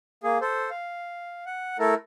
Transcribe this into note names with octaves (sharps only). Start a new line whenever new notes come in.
A#3 G#4
A4 C5
F5
F#5
A3 E4 A4 A#4